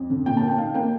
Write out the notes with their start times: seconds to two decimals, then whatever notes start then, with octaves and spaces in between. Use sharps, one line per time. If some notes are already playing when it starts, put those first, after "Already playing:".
Already playing: F2
0.10 D3
0.26 A#2 G5
0.37 A5
0.42 A#3
0.48 G5
0.58 D#4 F5
0.74 A#3 G5